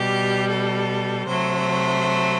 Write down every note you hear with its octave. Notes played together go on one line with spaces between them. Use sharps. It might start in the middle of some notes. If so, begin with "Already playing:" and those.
Already playing: B2 G3 G4
A4
C3 F#3 A3 C5